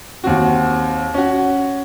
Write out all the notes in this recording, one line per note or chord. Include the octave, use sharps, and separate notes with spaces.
D#2 C4 F#4
C#4 F#4